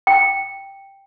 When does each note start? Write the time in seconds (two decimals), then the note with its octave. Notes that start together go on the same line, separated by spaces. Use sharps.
0.07 G5